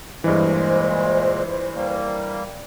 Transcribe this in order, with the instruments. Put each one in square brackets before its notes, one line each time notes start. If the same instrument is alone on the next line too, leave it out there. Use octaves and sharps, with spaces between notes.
[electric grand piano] G2 E3 [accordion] A#2 G#3 [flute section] C5
[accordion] G3 A#3